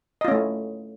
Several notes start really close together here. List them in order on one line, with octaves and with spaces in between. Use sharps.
D#5 F4 C#4 A3 E4